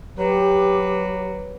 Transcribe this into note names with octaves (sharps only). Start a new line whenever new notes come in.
F#3 G4 B4